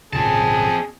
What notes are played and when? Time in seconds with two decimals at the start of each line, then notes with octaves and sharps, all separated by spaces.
0.13 G#1 A#2 C#3 C4 G#4 A5